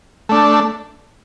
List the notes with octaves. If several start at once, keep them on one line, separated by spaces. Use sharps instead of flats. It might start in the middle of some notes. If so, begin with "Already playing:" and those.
A3 D4